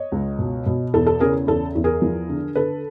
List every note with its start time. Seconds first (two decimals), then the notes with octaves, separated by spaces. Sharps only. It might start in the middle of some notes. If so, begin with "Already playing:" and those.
Already playing: C#5 D#5
0.12 C#2
0.39 B2
0.66 B2
0.94 E2 A4
1.07 A4
1.20 C#3 G#4 A#4
1.47 E2 A4
1.75 E2
1.84 G#4 A#4
2.02 F3
2.29 D3
2.55 D3 A4 B4